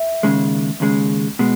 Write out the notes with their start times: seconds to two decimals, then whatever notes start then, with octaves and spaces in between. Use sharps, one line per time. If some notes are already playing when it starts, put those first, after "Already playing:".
Already playing: E5
0.23 D#2 C#3 G#3
0.80 D#2 C#3 G#3
1.39 B2 G#3